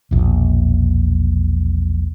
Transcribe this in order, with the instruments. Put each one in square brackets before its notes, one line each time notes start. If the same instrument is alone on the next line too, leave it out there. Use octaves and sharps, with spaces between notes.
[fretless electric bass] E1 A#1